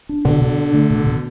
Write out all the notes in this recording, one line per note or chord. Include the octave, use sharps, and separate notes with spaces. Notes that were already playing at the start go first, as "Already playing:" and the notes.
D4
B2 D3
B2
D4
A3
B2
B2